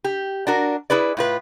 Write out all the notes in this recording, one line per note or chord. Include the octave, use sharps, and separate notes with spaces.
G4
D4 F#4 A#4
E4 G#4 B4 D5
A2 F4 B4